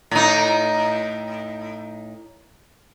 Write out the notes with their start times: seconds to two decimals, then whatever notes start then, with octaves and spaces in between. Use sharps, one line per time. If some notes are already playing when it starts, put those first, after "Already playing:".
0.11 A2 D#4